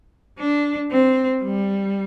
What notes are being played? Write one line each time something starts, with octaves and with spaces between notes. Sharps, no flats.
D4
C4
G3